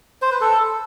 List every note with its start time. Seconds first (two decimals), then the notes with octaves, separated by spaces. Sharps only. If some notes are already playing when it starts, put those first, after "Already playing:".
0.22 C5
0.31 B4
0.41 A4